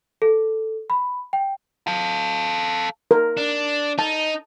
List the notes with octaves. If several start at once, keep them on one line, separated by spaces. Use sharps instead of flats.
A4
B5
G5
A4 F5
A#4
D4
D#4 A5